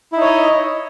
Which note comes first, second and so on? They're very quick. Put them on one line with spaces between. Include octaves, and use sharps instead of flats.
E4 D#4 C#5 D#5